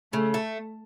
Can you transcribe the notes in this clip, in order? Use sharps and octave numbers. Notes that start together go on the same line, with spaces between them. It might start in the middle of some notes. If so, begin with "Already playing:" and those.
C#3 A3
A3